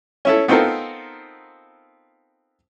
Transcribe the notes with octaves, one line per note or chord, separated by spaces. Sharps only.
C#4 E4 A4
B3 C4 D#4 F4 A4 A#4